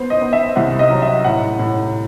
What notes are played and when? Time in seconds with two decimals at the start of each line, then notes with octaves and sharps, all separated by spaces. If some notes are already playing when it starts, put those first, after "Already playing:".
Already playing: B3 C5
0.10 D#5
0.21 B3
0.33 E5
0.56 C2 F#5
0.79 D#5
0.90 F#3
1.02 E5
1.24 A2 F#5
1.59 A2